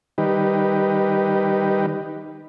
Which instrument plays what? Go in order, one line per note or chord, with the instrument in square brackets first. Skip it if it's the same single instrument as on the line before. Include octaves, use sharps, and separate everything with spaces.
[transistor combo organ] D#3 G3 D#4 G4 B4